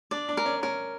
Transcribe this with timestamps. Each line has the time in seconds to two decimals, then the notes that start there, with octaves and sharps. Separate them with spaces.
0.11 D4 D5
0.29 D4
0.37 A#4
0.46 C#4
0.63 C#4 A#4